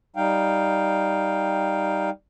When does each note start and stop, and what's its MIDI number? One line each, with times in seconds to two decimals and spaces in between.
0.16 2.10 55
0.16 2.10 63
0.16 2.10 77
0.16 2.10 79